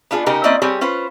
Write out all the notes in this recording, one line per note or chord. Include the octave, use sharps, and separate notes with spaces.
B3 D4 F4 G#4
C#3 B3 D#4 G4 A#4
A#3 C4 C#4 E4 D5 D#5
G3 C4 G4 G#4 C#5
C#4 F4 B4 C5